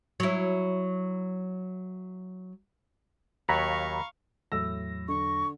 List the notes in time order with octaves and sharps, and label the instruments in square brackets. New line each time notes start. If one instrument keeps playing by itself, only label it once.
[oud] F#3 E4
[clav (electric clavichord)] D#2 F#3 C#5 [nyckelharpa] F5 C#6 [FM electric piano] A#5 B5
[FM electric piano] E2 F#3 A#6 [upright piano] A2 E6
[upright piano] D3 [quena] C#6